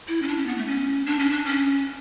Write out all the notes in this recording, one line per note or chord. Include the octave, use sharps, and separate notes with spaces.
E4
C#4
D4
C#4
B3
A3
C#4
D4
C#4
D4
C#4